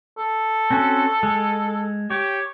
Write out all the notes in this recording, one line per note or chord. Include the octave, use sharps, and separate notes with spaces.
A4
C4 C#4 F#4
G#3
G4 C#5